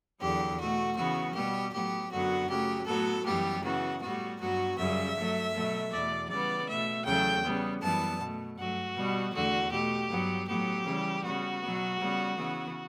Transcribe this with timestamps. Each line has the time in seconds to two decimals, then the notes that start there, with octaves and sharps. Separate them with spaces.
0.21 E2 D3 F#3 G4
0.59 B2 A3 F#4
0.97 C#3 E3 B3 F#4
1.35 B2 G3 B3 G4
1.73 A2 F#3 B3 G4
2.11 F#2 D3 F#3 B3 F#4
2.49 C#3 F#3 A3 G4
2.87 A2 F#3 B3 A4
3.25 F#2 E3 G3 B3 G4
3.63 C#3 E3 B3 F#4
4.01 A2 G3 B3 F#4
4.39 G2 F#3 B3 F#4
4.77 F#2 C#3 G3 E5
5.16 G2 F#3 A3
5.53 B2 F#3 A3
5.91 E2 B2 A3 D5
6.29 C#3 E3 G3 B3 D5
6.67 B2 A3 E5
7.05 E2 C#3 F#3 A3 G5
7.44 C#3 G3 B3
7.81 F#2 E3 G3 B3 A5
8.19 B2 A3
8.57 G2 F#3 A3 F#4
8.95 B2 G3 B3
9.33 E2 D3 A3 F#4
9.71 B2 A3 G4
10.09 G2 F#3 B3
10.47 A2 F#3 B3 G4
10.85 C#3 E3 G3
11.24 C#3 G3 B3 F#4
11.62 B2 F#3 B3
12.00 C#3 G3 B3
12.38 C#3 E3 B3